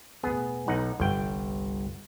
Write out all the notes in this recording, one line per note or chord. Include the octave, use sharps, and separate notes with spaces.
E1 A2 B3 G#4
B1 D#4 F#5
G1 C2 G2 G5